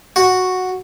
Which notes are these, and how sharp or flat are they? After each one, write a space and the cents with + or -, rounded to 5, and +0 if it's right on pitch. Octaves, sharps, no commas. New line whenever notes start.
F#4 -5